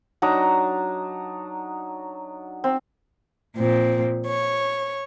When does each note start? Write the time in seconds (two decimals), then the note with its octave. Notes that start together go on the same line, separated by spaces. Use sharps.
0.22 F#3 D4 D#4 A#5
2.64 C4
3.57 A#2 F3 C4
4.26 C#5